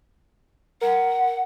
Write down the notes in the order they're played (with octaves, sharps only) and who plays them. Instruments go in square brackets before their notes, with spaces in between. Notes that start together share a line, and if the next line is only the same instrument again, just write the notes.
[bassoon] A#4 [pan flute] F#5